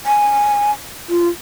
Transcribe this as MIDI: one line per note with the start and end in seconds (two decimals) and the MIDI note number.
0.06 0.71 80
1.09 1.28 65